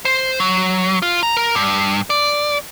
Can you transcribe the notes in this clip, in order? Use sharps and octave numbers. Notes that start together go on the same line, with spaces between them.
C5
F#3
F4
A#5
A#4
G2
D5